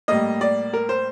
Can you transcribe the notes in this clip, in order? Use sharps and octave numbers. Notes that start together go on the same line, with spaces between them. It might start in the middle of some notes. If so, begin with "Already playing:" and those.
A2 G3 A#3 D#5
D5
A#4
C5